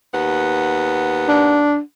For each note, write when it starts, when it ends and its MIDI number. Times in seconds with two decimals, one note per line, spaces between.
0.14 1.75 39
0.14 1.75 59
0.14 1.75 78
1.28 1.80 62